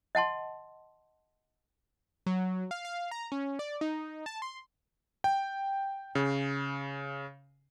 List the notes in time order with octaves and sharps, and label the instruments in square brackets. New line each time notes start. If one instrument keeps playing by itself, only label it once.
[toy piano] D#5 F#5 A5 C6
[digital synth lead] F#3
F5
F5
A#5
C#4
D5
D#4
A5
C6
[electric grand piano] G5
C#3